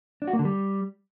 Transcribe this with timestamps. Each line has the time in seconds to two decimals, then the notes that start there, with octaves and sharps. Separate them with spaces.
0.22 D4
0.28 F#4
0.33 A#3
0.39 D3
0.45 G3